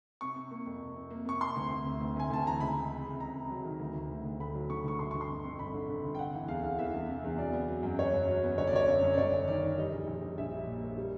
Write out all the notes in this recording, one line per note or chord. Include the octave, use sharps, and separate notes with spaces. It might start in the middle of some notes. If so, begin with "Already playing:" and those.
C3 C#6
C3
A#3
F2
C3
C3
A#3
C3 C#6
C3 C6
D2
D2
C3
D2
D2 G#5
D2 A5
E3 A#5
C#2 B5
C3
C3
C3
C#2 A#5
C3
F#3
D#3
D2
D2
D2
D2
D3 B5
F#3
D3 C#6
D2 C#6
G1 C6
G1 C#6
C6
F2
F2
G1 B5
D3
G1
G1
G5
C3 F#5
E3
E2 F5
E2
E3 E5
E2
C3
E2
F#3 D5
B3
F#3
F#2
B3 C#5
F#2
F#3
B3
G1 C#5
D5
G1 C#5
F#2
F#2
D5
G1 C#5
F#2
D#3 D5
D#3
G3 D#5
A#1
A#1
A#1
A#1 E5
G3
A#2
A#3
G3